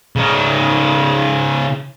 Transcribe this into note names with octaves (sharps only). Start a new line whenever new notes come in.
C#3 D#4